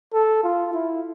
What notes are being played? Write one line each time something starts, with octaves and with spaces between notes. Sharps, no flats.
A4
F4
E4